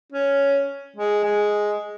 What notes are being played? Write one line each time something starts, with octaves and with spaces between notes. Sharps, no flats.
C#4
G#3
G#3